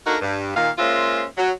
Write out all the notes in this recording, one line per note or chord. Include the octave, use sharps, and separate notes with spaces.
A#3 D4 D#4 F#4 A4 A#4
G2
A#2 D#3 F5
G#3 A#3 C#4 F4 C5 E5
F#3